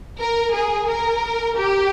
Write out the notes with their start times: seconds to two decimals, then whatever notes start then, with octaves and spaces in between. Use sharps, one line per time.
0.19 A#4
0.54 G#4
0.89 A#4
1.57 G4